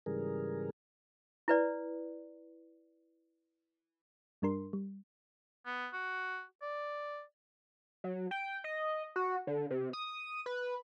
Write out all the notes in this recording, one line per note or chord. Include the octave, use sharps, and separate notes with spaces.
G#2 C#3 E3 G3 G#4 A#4
E4 B4 D5
G2 G3 D4 A#4 C6
G3
B3
F#4
D5
F#3
G5
D#5
F#4
D3
C3
D#6
B4